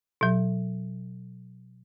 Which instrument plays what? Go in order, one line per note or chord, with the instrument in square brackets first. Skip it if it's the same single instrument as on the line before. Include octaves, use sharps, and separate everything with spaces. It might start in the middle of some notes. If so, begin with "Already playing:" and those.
[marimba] B2 F#3